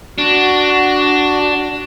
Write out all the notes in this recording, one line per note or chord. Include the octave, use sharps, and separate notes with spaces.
D4 F#4